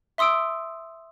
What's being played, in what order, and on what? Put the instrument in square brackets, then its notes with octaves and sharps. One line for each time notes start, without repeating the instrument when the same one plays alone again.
[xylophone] E5 C6 D#6 E6 D7